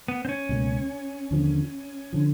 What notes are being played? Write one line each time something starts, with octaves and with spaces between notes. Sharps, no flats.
B3
C4
C#4
C#2 B2 F#3 A#3
D#2 D3 F3
D3 F3